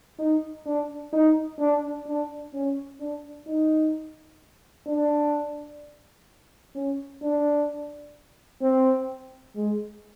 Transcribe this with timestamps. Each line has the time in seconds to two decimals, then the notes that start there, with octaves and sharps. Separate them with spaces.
0.19 D#4
0.66 D4
1.13 D#4
1.59 D4
2.07 D4
2.54 C#4
3.00 D4
3.47 D#4
4.87 D4
6.75 C#4
7.22 D4
8.62 C4
9.56 G#3